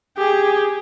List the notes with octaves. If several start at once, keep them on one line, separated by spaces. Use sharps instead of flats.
G4 G#4